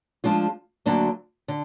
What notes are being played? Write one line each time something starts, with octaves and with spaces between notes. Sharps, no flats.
F3 G#3 D4 F4
D2 D3 F#3 A#3 D4
D3